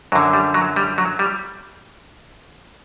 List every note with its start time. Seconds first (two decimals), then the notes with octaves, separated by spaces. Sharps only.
0.12 F#2 D3 F#3
0.33 G3
0.54 F#3
0.76 G3
0.98 F#3
1.19 G3